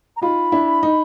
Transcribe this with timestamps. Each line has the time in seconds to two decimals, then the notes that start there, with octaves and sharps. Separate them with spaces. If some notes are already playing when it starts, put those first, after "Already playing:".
0.17 A#5
0.22 D#4 F4 B5
0.52 D4 E4
0.83 D#4